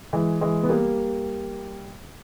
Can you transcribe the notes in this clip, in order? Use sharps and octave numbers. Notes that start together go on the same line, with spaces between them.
E3 G#3
E3 G#3
B3
G3 A#3